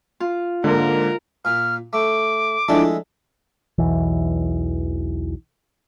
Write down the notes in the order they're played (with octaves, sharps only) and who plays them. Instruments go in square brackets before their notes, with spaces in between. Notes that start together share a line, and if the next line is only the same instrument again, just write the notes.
[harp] F4
[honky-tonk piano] G#2 A#3 [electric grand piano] D3 [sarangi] A#4
[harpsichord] A#2 [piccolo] F6
[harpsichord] A3 [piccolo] D6
[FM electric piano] F3 D4 E4 [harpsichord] G#3 A3 A4
[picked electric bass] B1 E2 E3